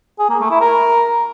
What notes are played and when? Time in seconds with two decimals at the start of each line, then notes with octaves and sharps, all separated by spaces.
0.19 G#4
0.30 A#3
0.40 A3
0.51 E4
0.61 A#4